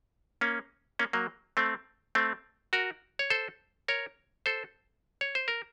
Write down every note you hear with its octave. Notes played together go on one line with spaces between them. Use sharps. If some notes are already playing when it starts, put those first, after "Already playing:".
A#3 C#4
A#3 C#4
F#3 A#3
A3 C4
A3 C4
F#4 A#4
C#5
A4 C5
A#4 C#5
A4 C5
C#5
C5
A#4